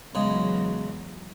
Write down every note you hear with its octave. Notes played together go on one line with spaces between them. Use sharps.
E2 C#3 F#3 G#3